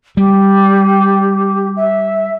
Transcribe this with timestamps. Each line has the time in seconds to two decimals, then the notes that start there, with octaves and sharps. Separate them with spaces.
0.17 G3 G4
1.77 E5